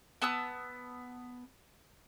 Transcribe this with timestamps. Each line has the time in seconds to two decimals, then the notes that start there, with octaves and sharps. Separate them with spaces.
0.22 B3 A5 D#6 E6